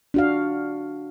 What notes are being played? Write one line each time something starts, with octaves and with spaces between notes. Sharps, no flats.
D4 F#4 F5